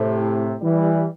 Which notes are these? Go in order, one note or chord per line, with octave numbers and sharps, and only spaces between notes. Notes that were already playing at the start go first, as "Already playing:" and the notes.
Already playing: A2 C3
E3 G3